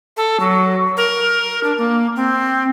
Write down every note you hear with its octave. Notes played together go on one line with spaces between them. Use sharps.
A4
F#3
A#4
D4
A#3
C4